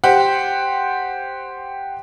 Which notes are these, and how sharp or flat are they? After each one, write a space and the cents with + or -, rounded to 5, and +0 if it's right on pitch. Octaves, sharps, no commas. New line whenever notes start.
G4 +0 C5 +0 F#5 +0